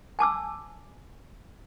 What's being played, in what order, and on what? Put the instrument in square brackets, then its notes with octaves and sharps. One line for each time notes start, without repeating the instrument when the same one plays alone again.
[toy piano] G#5 A5 D6 E6